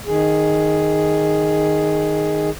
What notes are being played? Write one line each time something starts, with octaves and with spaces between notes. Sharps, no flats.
D#3 G#4